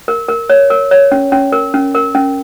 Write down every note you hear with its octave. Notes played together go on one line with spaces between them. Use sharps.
A#4
A#4
C#5
A#4
C#5
C#4
C#4
A#4
C#4
A#4
C#4